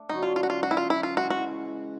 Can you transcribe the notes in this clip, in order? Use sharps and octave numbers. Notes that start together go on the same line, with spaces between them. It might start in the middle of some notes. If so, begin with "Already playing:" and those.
Already playing: A3 D4
F#2 D3 F#3 D#4
F4
F4
F#4
F4
F#4
E4
F4
E4
F4
C#3 E3 G#3 F#4
F#4